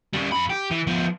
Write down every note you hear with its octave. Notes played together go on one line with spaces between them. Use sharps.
G3 C#4
F2 B5
G4
E3
F3 B3